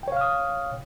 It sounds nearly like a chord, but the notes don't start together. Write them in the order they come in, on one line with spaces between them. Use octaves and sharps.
G5 C#5 F5 F6 D#6